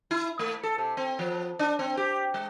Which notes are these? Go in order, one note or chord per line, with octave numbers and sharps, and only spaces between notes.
E4
A3
A4
C3
C4
F3
D4
C4
G4
G#3